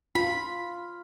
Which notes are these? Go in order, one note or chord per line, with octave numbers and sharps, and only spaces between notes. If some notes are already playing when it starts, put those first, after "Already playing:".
F4 B5